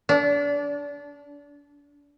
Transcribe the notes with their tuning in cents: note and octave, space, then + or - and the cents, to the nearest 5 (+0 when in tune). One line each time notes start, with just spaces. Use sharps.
D4 -30